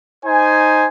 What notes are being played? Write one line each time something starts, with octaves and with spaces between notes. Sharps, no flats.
D#4 C5 G#5